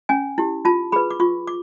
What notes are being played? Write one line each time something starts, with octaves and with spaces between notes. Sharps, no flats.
C#4 G#5
E4 G4
F4 A5
G#4 B4 B5
D6
F4 C#6
D6